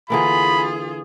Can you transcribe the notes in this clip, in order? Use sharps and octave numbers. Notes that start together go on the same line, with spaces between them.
D3 E3 A#3 F4 G#4 B5